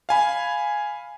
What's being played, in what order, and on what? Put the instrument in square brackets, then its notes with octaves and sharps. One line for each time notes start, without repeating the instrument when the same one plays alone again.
[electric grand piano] F5 G#5 B5